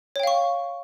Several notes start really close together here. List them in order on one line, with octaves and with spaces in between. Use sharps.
C#5 G5 F5 C#6